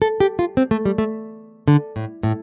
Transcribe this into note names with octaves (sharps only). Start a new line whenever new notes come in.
A4
G4
F4
C4
A3
G3
A3
D3
A2
A2